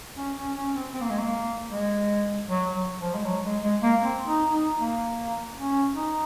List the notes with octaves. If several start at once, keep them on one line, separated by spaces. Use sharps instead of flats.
C#4
C#4
C#4
C4
C4
A#3
G#3
A#3
G#3
F#3
F#3
F3
G#3
F#3
G#3
G#3
A#3
C4
D#4
D#4
A#3
C#4
D#4